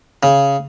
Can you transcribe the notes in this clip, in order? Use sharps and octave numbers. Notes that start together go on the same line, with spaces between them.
C#3